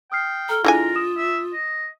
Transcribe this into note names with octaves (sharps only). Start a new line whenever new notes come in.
G5 D#6 F6 C7
A4 A#5 F6 G7
D3 G#3 E4 F4 A#4 G#5 A#5
D#6 E7
E5
D#5